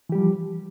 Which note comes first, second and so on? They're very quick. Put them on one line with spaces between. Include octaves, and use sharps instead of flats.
E3 G4 G3 F3